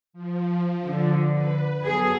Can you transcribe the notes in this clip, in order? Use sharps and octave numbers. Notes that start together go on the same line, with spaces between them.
F3
D3
B4
F#3 B3 G#4 A4